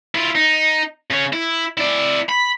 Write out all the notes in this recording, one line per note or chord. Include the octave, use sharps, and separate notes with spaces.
E4 F4
D#4
C#3 C#5
E4
E4 D5
B5